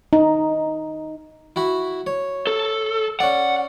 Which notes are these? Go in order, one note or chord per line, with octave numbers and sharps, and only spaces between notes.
D#4
E4 F#4 B5
C#5
A4
C#4 D5 F#5